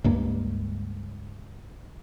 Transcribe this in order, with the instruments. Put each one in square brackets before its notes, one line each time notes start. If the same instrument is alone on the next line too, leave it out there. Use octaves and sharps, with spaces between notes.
[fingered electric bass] C#2 G2 A#3